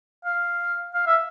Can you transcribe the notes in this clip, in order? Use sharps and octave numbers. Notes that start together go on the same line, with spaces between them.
F5
F5
E5